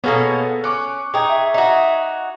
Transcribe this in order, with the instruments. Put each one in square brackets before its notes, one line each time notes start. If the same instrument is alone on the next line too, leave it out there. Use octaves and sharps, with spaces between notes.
[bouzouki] B2 A#3 C#4 [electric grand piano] B3 G#4 A4
[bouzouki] C#4 [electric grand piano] C#6 D6 F#6
[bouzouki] D#4 G#4 [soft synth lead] G5 [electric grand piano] C#6 G#6
[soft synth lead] E5
[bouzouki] D#4 F#4